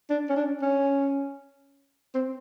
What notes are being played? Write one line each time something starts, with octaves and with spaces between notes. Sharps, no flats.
D4
C#4
D4
C#4
C4